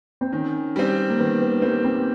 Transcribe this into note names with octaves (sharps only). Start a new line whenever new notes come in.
C4
D#3 C#4
G3 C4
A#3
D#3 B3
B3
G3 A#3 C4
C4